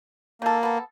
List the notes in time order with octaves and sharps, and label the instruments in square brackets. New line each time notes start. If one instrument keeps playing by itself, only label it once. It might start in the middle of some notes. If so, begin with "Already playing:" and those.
[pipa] D#3 A4 [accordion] A#3
[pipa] B3 A4